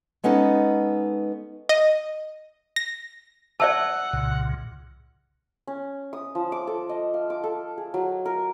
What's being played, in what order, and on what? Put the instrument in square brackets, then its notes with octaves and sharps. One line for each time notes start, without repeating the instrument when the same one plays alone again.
[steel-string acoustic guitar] G#3 B3 C#4 D#4 A4
[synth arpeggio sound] D#5
A#6
[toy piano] D5 E5 A5 [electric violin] F#5 [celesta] E6
[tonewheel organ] C2 A#2 C#3
[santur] C#4
D#6
F3
D6
A4
D#5
F5
D6
A4
G#4
F#3
A#4